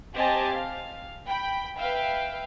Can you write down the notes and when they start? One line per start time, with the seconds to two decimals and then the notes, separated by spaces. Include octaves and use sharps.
0.15 C4 G4 D#5 G#5 A5
0.52 F5
1.27 G5 B5
1.79 B4 E5 F5 G5